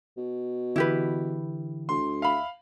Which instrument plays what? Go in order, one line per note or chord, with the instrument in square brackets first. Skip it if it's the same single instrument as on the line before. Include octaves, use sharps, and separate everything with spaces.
[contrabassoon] B2
[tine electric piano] D3 E3 [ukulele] E4 G4 B4
[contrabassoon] D2 [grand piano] C6
[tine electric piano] E5 [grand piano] F5 B5